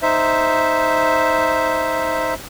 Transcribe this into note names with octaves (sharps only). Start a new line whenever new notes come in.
D#4 C5 E5